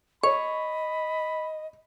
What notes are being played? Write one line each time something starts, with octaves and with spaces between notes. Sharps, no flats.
C#5 D#5 B5 C#6